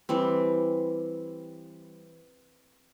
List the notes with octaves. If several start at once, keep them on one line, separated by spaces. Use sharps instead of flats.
E3 G3 C4